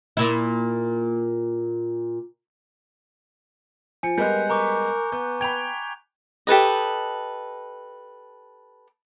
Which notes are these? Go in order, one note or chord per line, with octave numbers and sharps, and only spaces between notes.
A#2 E4
F3 G#5 C#7
G3 G#3 B3 A#4 F#6 G6
A#4 A#5 C#6 D6
B3 G6
G5 B5 G#6 F7
G4 A4 B4 D#5